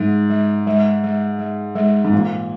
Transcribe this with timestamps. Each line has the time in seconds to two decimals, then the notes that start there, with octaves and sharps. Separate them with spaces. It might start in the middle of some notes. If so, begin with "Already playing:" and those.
Already playing: G#2 G#3
0.30 G#3
0.67 G#3
1.03 G#3
1.39 G#3
1.75 G#3
2.05 G#2
2.13 A#2 E3